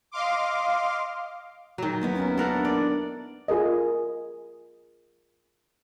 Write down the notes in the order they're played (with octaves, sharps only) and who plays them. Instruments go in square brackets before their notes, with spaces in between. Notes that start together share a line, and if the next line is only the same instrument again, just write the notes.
[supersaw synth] D#5 F5 C6 D6
[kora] D#3 F#3
[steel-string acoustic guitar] D#2 B3 E4
[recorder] C#4
[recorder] D4 [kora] A4 A#4 F#5
[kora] D5
[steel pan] F4 G#4 A#4 D#5